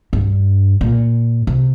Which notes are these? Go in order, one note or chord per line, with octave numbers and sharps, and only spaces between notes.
G2
A#2
C3